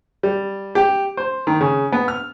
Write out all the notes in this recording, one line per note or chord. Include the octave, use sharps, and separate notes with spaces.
G3
G4
C5
D#3
C#3
B3
F6